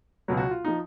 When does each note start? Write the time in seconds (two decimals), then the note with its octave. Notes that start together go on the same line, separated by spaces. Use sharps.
0.28 C#2 B2 F#3
0.37 F#4
0.51 F4
0.65 F3 D#4